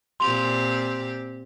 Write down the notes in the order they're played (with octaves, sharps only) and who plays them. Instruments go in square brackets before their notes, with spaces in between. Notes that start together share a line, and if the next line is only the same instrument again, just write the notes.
[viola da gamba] A#2 C4 G4 [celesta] C6 F7